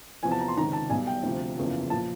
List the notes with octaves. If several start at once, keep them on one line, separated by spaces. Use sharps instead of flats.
E2 C3 F3 G#5
A5
A#5
C6
C#2 C3 D#3 A#5
A5
B1 B2 G3 G#5
G5
D2 C3 F3
F#1 E2 C#3 F3
A#2 F3 A5